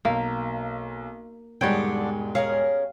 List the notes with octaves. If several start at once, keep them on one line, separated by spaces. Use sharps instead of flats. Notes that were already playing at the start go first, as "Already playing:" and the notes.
B1 A#3
E1 G#2 D3 G3 G#3 D4 C#5 G5
C#4 G#4 A#4 F5